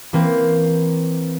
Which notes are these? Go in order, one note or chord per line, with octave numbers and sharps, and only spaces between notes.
E3 A#3 C4